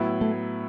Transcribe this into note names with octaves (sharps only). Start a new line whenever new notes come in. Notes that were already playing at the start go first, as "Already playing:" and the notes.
Already playing: A2 F#3 B3 E4
A3